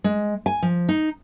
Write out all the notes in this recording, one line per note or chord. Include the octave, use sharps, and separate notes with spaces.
G#3
G#5
F3
D#4